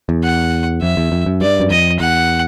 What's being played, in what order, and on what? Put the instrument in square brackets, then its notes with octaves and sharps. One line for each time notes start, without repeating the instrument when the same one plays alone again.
[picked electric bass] E2
[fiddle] F#5
[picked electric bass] F2 [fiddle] E5
[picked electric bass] E2
F2
F#2
[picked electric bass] G2 [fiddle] D5
[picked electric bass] F#2
[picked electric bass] F2 [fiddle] D#5
[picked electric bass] E2 [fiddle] F#5